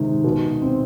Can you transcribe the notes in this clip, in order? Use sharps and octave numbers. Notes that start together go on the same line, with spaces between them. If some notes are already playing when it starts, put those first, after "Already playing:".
Already playing: C3 D#3 G#3
B2
C4